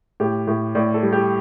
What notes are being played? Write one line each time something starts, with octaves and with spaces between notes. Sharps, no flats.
A2 G4
A2
A2 D5
A4
G3
G4